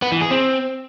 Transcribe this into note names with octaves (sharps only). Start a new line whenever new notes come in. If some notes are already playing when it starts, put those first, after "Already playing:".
B3
E3
G#4
C4